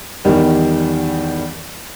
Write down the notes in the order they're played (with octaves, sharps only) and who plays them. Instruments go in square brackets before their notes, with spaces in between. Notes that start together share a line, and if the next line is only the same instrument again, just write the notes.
[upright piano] E2 D#3 G3